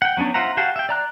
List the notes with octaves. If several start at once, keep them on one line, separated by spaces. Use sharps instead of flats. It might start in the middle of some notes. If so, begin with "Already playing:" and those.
F#5 G5
F#3 B3 C#4 D4
F4 C5 E5 F#5 A#5
F#4 G4 F5 F#5 A5
E5 G5
D5 A#5 F#6